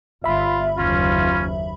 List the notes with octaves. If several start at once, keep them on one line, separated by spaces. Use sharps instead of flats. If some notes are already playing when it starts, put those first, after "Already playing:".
G1 F4 E5 B5
F#1 D#2 C#4 F4